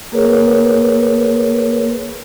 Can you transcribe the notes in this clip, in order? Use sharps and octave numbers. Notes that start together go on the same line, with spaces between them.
A#3 G#4 A#4 B4 C#5